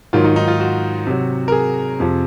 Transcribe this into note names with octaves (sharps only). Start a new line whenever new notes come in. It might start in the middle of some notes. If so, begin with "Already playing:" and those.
G#2 D#3 F#3 F4
D#4
D#4
F4
F#4
C3 F#3
A#4
G#4
F2 C3 F3